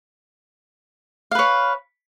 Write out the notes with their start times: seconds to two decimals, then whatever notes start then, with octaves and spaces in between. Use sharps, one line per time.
1.31 F5
1.35 B4
1.39 C#5